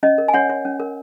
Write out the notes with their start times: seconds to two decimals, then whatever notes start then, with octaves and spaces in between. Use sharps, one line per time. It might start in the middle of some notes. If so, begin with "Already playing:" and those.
0.03 C#4 D#5
0.18 A#4
0.28 G#5
0.34 C#4 C#5 F#5
0.50 C#5
0.65 C#4
0.80 A#4